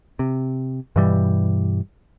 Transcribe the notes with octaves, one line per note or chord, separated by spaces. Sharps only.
C3
G2 B2 E3 G3